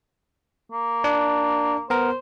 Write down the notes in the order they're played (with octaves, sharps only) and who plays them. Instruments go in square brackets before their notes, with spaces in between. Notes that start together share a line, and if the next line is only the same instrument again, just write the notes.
[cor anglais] A#3
[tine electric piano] D4
[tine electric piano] B3 A#4 [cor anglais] C5